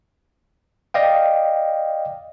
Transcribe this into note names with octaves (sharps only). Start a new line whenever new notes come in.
D5 D#5 F5 G5